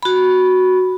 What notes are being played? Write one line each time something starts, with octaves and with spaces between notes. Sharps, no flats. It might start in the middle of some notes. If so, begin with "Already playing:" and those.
F#4 B5